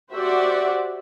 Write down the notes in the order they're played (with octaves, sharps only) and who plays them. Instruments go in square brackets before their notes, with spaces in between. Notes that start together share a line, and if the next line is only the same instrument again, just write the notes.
[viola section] F#4 G4 C5 D5 E5 F#5